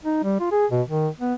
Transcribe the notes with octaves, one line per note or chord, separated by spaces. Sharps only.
D#4
G3
F4
G#4
B2
D#3
B3